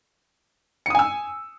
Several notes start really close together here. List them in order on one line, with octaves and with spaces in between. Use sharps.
C#7 D#6 G#5 E6